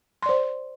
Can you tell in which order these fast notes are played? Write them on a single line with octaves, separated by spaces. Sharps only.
C6 D5 C5